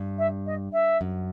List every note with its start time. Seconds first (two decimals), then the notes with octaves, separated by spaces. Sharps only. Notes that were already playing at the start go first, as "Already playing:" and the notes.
Already playing: G2
0.18 E5
0.46 D#5
0.73 E5
1.01 F#2